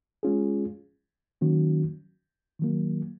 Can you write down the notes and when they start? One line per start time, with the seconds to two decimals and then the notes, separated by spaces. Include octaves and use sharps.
0.23 G#3 C#4 F4 G#4
1.41 D#3 F#3 A#3 C#4 F#4
2.59 D#3 F#3 A#3